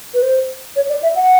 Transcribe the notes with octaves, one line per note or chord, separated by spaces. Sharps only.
B4
C5
C#5
D5
E5
F#5